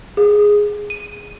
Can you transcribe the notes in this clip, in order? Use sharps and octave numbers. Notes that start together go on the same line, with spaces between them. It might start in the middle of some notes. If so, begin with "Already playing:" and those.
G#4
D#7